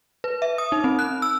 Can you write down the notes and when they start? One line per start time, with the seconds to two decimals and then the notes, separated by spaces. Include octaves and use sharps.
0.24 B4
0.42 E5
0.58 D#6
0.72 D#4
0.84 C4
0.99 F#6
1.22 E6